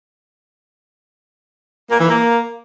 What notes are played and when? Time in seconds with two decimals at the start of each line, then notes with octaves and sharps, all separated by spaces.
1.90 A#3
1.99 E3
2.08 A#3